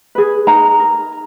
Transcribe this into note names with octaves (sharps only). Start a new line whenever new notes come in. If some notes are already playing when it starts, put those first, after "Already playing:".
G#4 B4
D#4 A#5
A#4